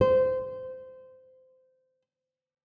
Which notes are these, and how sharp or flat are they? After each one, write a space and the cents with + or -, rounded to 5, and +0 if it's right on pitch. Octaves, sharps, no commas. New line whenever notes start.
C5 -20